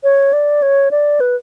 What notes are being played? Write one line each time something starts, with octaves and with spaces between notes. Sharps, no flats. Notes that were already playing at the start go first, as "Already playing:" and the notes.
C#5
D5
C#5
D5
B4